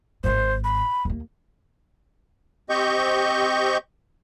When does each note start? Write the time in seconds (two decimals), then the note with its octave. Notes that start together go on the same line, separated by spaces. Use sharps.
0.24 G#1 G#2 C5
0.64 B5
1.05 D#2 A#3
2.70 C4 G4 D#5 C#6 G6